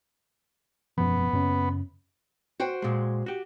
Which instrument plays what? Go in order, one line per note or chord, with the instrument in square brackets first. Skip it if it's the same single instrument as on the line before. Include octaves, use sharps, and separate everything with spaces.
[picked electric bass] E1 F#2 F3 [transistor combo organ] B3
[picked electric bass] F#2 C#3 C#4
[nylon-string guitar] F#4 C5 G5
[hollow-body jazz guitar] A#2 G#3
F#4 G4